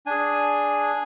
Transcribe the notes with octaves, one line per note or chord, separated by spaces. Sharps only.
D4 G#4 G#5